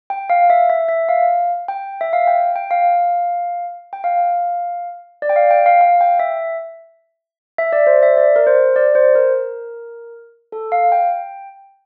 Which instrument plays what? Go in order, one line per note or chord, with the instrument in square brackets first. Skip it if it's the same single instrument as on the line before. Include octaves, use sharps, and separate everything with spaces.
[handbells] G5
F5
E5
E5
E5
F5
G5
E5
F5
G5
G5
F5
G5
F5
D5
G5
F5
G5
F5
F5
G5
E5
E5
D5
C5
E5
D5
A#4
C5
D5
C5
A#4
A4
F5
G5